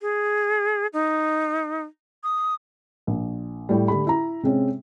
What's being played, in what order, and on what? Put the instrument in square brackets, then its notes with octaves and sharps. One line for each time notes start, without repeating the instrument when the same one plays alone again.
[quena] G#4
D#4
D#6
[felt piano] A#1
A2 G3
D3 A3 G4 B5
E4 A#5
C3 G#3 C4 C#4